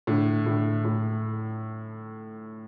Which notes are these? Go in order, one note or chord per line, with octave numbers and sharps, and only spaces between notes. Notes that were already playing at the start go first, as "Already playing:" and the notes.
A2 D3
A2 D3
A2